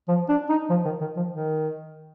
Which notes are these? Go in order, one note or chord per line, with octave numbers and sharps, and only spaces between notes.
F3
D4
D#4
F3
D#3
D#3
F3
D#3